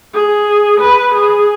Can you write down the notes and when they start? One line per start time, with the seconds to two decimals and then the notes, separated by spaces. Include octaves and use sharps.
0.14 G#4
0.81 B4
1.15 G#4